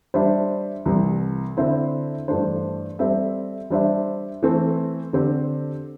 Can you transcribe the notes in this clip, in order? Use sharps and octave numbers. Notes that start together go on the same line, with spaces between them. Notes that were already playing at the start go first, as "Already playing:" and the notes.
G3 D4 C5 E5
C2 C3 E3
D3 C4 E4 C5 E5
G2 E3 A3 D4 C5
G3 C4 A4 E5
G3 D4 C5 E5
E3 A3 C4
D3 C4 G4 C5